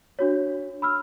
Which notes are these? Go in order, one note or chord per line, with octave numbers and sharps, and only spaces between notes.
D4 F#4 C#5
B5 E6 F6